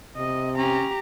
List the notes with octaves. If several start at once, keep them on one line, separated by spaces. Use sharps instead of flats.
C3 D#5
C#4 G4 A#5